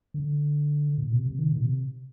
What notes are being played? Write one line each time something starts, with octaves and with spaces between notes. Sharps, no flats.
D3
A#2
C3
C3
D#3
A#2
C3